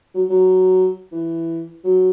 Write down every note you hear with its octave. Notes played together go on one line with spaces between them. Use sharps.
F#3
F#3
E3
F#3